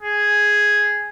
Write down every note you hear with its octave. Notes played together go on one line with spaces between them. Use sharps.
G#4